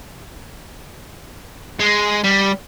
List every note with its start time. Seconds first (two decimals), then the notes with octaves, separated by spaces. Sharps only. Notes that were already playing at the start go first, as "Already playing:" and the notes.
1.80 G#3
2.24 G3